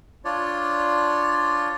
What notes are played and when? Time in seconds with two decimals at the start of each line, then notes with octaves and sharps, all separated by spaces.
0.25 D4 F4 C#5 D5